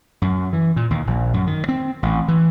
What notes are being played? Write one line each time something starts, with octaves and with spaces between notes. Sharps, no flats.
F#2
E3
A#2
D#2
A#1
F#2
D#3
C4
A1
E3